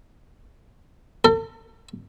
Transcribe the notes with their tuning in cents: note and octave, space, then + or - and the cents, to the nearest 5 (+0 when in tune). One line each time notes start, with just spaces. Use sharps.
A4 +40